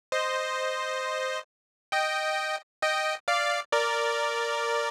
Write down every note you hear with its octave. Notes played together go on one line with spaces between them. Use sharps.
C5 D#5
D#5 G5
D#5 G5
D5 F5
A#4 D5